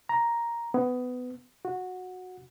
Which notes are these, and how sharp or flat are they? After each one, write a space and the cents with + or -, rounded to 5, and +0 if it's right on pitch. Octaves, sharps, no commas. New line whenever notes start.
A#5 +5
B3 +20
F#4 -15